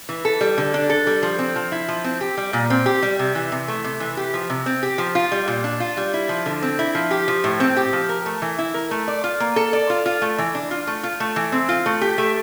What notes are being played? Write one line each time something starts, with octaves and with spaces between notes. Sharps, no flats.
E3
A4
G3
D3
D4
A4
G3
F3
C4
F3
E4
F3
C4
G4
G3
A#2
C4
G4
G3
C3
E3
C3
A3
C3
E3
G4
F3
C3
C4
G4
F3
F4
G3
A#2
D4
F4
G3
E4
F3
D3
C4
E4
F3
G4
F3
A2
C4
G4
F3
A#4
A3
E3
E4
A#4
A3
D5
F4
A#3
A4
D5
F4
F4
A3
E3
D4
F4
A3
F4
A3
E3
C4
F4
A3
G4
A3